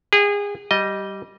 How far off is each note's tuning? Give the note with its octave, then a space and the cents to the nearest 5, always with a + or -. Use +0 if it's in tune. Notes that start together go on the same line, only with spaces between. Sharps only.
G#4 -30 G5 -45
G3 -10 D#5 +0